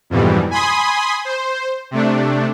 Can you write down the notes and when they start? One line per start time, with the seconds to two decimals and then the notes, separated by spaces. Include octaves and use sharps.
0.10 F2 G#2 B2 E3 G3
0.51 G#5 B5 C6 D#6
1.25 C5
1.91 C3 A3 D4